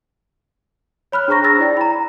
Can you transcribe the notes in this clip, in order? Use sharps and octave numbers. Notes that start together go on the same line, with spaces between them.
C#5 B5 F6 F#6
D4 G#4 C5 A#5 C#6 A#6
E6 A6 A#6
E4 D5 G5
A#5 B5